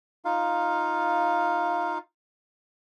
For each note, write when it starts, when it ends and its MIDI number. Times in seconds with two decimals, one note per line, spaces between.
0.25 1.98 63
0.25 1.98 65
0.25 1.98 77